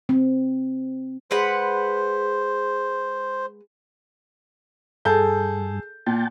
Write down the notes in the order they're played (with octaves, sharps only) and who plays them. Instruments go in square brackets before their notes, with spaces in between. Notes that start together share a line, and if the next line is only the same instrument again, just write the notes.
[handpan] C4
[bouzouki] G#3 B4 F#5 [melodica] C5
[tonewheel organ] G2 [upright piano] G#4 A4 G6
[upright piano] A#2 [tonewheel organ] G5 A5